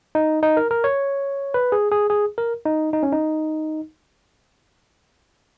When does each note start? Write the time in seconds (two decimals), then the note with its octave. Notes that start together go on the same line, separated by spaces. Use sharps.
0.15 D#4
0.43 D#4
0.57 A#4
0.71 A#4
0.84 C#5
1.54 B4
1.72 G#4
1.92 G#4
2.10 G#4
2.38 A#4
2.66 D#4
2.93 D#4
3.03 C#4
3.12 D#4